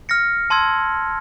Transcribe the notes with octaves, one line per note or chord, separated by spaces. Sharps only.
F6 A#6 C#7
A5 C6 E6 G#6